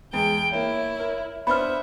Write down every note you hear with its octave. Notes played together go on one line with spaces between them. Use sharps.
E2 G#3 G5
A#3 E4 C#5
A#4
B3 D4 C5 E5 B5 F6